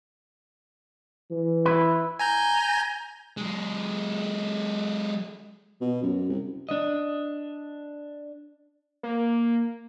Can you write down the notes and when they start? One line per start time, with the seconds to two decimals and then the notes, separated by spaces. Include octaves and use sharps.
1.31 E3
1.65 E4 B4
2.19 G#5 A#5 G6
3.37 F#3 G#3
5.81 B2
6.03 F#2
6.29 C2
6.69 D4 D#5
9.03 A#3